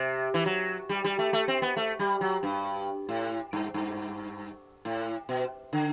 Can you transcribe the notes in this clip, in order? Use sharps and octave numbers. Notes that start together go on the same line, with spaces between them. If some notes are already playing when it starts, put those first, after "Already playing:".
Already playing: C3
E3
F#3
G3
G3
A3
A3
C4
B3
A3
G3
F#3
G2
A2
G2
G2
A2
B2
D3